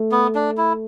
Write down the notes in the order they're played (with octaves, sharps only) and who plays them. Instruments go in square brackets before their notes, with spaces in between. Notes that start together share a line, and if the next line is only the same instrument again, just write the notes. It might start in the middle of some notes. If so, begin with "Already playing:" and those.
Already playing: [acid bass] A3
[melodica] B3
D4
E4